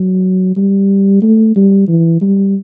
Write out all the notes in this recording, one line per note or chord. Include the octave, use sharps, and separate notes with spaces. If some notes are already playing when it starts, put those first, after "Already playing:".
Already playing: F#3
G3
A3
G3
E3
G3